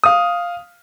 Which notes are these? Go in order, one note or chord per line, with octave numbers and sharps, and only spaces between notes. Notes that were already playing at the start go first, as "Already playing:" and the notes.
F5 D#6